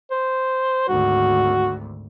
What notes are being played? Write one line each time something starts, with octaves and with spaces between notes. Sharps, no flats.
C5
G#1 D2 F#4